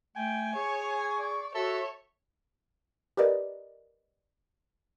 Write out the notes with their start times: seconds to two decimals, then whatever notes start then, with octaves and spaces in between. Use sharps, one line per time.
0.16 A3 G5 G#5
0.56 G#4 C#5 C#6
1.17 D5
1.55 F#4 A4 C#5 E5
3.17 G4 A#4 B4 D5 D#5